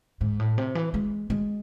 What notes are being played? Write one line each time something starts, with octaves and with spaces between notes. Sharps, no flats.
G#2
A2
C3
E3
G#3
G#3